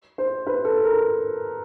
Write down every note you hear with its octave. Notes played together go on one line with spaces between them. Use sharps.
C5
B4
A4
A#4